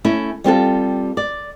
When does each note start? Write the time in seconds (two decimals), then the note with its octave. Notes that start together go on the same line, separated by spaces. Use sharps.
0.05 A3 C#4 E4
0.44 G3 C4 F4 A4
1.17 D5